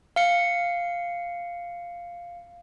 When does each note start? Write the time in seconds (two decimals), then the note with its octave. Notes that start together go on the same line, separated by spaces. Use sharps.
0.16 F5 C#7